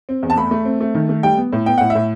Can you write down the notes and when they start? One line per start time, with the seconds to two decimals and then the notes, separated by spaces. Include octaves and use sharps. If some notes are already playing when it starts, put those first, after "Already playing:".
0.09 C4
0.23 E2
0.30 A5
0.37 A3 B5
0.51 A3
0.65 C4
0.80 A3
0.95 D#3
1.09 A3
1.23 G3 G5
1.37 B3
1.53 A2
1.66 B3 G5
1.78 A2 F#5
1.90 E5
1.95 A2